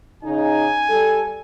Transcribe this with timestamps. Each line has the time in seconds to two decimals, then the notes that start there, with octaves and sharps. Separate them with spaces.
0.23 C#3 D#4 G#5
0.89 G3 A4